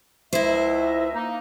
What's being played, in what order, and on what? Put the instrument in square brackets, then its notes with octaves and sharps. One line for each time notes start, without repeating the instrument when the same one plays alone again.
[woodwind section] C#2 D#5 E5 [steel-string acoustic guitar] E4 C5
[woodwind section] A#3 D#4